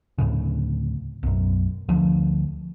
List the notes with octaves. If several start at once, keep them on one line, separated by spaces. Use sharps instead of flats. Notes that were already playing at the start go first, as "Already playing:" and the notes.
D2 A2 C#3
B1 F#2
D2 F3